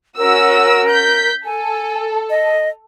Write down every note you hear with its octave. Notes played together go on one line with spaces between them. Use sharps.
C#4 F#4 A#4 E6
G6 B6
A4 G#5
D#5